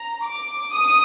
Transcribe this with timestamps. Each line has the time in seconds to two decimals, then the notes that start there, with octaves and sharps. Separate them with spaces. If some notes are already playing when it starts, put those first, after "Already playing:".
Already playing: A#5
0.25 D6
0.73 D#6